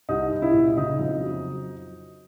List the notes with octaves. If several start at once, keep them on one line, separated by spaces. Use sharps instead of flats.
C2 D#4
C2
E4
A#2
C#3 D#4
F2
F#3